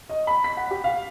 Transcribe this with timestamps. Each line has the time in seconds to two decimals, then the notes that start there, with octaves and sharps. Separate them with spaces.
0.10 D#5
0.27 B5
0.44 B6
0.57 F#5
0.71 G4
0.84 F5